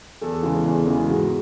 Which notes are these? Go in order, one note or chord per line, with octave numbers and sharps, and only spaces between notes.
E2 A4
C#3 E3 G#3 B3
E2
C#3 E3 G#3 B3
G#2 F#4